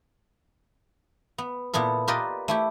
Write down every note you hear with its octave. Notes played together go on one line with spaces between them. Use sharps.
B3
A#2 B3 E4 A4
F4 G4 A#4 B4 D5 D#5
A3 E4 G4